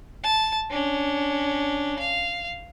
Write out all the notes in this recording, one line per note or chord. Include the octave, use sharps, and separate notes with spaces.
A5
C#4 D4
F5